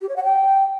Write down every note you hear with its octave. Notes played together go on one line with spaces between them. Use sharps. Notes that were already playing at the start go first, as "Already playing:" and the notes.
G4
C#5
F#5
G5